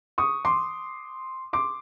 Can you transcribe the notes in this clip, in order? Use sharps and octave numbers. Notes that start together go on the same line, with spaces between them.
C#6 D#6
C6 D6
C6 D6